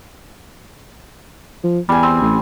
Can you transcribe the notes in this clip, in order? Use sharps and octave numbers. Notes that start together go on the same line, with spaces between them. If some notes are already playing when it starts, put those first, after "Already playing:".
F3
E2 G3 G#5
C4
A1